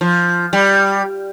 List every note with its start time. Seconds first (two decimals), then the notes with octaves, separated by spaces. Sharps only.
0.01 F3
0.53 G3